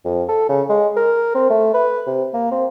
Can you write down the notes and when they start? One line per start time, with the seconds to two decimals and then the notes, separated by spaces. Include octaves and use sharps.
0.05 F2
0.29 A4
0.49 C#3
0.69 G#3
0.96 A#4
1.35 C4
1.50 A3
1.74 B4
2.07 C3
2.33 A#3
2.51 C4